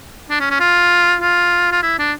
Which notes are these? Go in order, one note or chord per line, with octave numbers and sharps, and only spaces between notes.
D4
C#4
C#4
F4
F4
F4
E4
D4